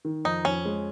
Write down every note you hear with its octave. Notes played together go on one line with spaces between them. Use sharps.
D#3
F2 D#4
F2 C#4
G#3